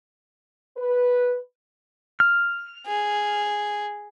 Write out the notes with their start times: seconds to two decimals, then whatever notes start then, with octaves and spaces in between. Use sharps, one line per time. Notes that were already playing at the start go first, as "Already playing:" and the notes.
0.77 B4
2.20 F6
2.87 G#4